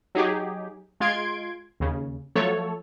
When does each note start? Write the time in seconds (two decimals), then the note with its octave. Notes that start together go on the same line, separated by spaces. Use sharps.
0.15 F#3 D#4 G4 G#4
1.00 G#3 F4 C6 G#6 D7
1.80 D#2 C#3
2.35 F3 F#3 A3 A4 C#5